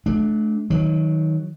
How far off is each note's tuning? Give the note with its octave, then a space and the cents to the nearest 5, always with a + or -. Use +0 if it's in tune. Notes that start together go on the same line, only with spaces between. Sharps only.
A3 -35 D4 +0
D#3 +20 F#3 +0